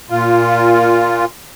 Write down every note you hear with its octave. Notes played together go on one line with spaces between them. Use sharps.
A#2 F4